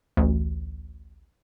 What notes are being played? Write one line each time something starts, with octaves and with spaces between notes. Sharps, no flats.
A1 D2